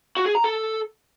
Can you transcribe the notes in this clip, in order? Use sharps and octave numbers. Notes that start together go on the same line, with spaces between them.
F#4
G#4
A#5
A4